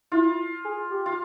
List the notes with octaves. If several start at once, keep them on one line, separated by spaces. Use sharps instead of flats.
E4 F4
G#4
G4
F4